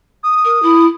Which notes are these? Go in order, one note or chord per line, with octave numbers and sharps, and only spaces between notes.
D#6
A#4
E4